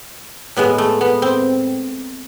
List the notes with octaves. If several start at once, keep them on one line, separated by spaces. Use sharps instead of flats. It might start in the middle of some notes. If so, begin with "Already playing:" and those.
A2 G#3 B3
A3
B3
C4